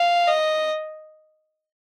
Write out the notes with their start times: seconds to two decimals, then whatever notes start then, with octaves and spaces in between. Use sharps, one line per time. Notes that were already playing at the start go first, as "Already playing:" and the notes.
Already playing: F5
0.27 D#5